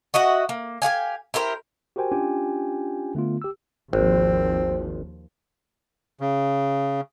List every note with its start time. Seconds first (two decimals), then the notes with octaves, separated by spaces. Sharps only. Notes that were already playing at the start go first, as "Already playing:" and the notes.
0.14 F#4 D#5 E5 F#5
0.49 A#3
0.82 G4 G#4 F5 G#5
1.34 E4 G4 A#4 C5
1.96 F#4 G4 A#4 C5 G5 G#5
2.12 C#4 D4 F4 G4 G5 G#5
3.15 D3 A3 B3 F4
3.42 G4 E6
3.93 G#1 D#2 F3 C4
6.21 C#3